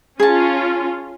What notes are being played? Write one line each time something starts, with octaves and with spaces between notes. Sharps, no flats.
C#4 F4 G#4 A5